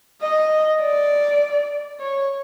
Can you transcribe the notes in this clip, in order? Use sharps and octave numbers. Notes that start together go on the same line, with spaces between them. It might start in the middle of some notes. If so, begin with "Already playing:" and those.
D#5
D5
C#5